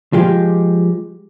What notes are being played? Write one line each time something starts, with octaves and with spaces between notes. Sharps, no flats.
F3 G#3 G4